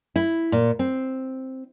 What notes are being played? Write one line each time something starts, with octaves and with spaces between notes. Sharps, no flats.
E4
A#2
C4